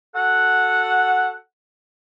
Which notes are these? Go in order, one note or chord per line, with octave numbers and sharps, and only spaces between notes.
F#4 A4 F#5